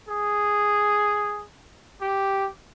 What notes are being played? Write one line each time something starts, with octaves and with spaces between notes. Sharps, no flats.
G#4
G4